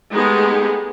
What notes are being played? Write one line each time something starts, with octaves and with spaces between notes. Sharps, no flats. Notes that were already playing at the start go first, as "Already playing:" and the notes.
G#3 A3 B3 D#4 G4 G#4